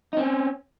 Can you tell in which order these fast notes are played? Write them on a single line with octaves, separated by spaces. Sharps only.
D#4 C4 C#4